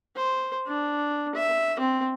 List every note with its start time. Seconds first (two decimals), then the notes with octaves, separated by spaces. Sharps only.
0.16 C5
0.67 D4
1.35 E5
1.80 C4